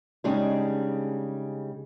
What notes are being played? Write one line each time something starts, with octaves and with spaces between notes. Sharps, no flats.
C#3 G3 G#3 D4 D#4